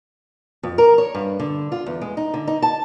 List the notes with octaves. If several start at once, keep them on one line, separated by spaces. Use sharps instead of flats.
F2
A#4
C#5
G2
D3
F4
E2
G#3
D#4
D3
D#4
A5